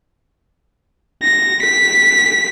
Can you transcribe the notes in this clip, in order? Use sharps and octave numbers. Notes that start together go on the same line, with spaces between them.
A#6
B6